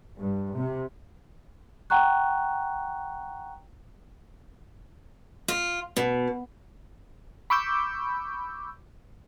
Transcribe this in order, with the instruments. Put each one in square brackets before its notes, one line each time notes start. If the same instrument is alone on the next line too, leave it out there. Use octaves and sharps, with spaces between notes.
[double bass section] G2
C3
[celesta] F#5 G5 A#5 C#6 F#6
[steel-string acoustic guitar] F4
B2
[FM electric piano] B5 C#6 D6 E6 G6